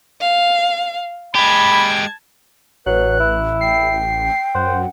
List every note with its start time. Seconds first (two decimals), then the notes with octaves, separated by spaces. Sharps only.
0.21 F5
1.35 G#3 G4 A5 B5 G#6
2.86 A1 F#3 B4 F#6
3.20 E4
3.61 G5 C7
4.55 F#2 C5 F#5